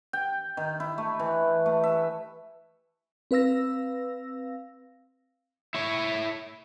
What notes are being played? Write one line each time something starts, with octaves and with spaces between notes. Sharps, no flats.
G5
D#3
E4
A3
E3
A3
E5
C4 B4 F5 E6 A#6
E4 C#5